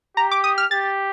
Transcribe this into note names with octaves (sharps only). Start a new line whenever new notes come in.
G4 A#5
D6
D#6
F6
G4 A6